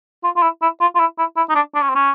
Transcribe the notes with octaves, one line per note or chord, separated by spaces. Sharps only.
F4
F4
E4
E4
F4
F4
E4
E4
E4
D#4
D4
D4
C#4
C4
C#4